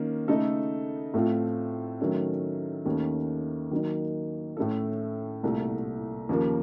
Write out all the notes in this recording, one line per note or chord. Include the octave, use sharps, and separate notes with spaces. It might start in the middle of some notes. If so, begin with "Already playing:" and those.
Already playing: D#3 A#3 C#4
C#3 A3 D#4 A4
A2 A3 C4 F4
D#3 F#3 A3 C#4
D#2 D#3 A3 C#4
D#3 F#3 A#3 D#4
A2 A3 C#4 A4
C2 A#2 A3
D#2 C#3 F3 A#3